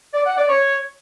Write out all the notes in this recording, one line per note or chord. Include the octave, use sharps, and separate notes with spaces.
D5
F#5
D5
C#5